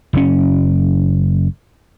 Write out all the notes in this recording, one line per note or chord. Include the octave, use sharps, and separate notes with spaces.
F#1 C#3 C#4